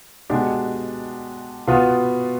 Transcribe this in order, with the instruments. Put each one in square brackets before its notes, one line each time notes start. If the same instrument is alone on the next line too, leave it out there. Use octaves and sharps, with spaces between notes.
[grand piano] B2 G#3 D4 G4
B2 B3 F4